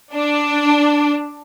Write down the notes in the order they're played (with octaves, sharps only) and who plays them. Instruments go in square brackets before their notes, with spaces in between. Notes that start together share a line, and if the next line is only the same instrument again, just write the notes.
[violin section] D4